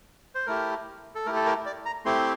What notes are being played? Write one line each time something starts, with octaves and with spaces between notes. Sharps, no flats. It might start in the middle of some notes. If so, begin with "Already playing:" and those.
C5
A3 E4 G4 A#4
A4
A3 E4 G4 A#4
A4
A#4
D5
A#5
A3 C4 E4 G4 C6